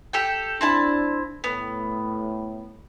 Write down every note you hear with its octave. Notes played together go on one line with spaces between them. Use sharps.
G4 A4 G5
C4 D4 E4 A5
A2 B3